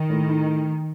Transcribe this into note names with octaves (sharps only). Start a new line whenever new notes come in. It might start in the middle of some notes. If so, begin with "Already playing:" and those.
Already playing: D#3
A2
D#4